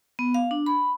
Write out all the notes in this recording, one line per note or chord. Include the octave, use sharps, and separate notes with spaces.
B3
F5
D4
B5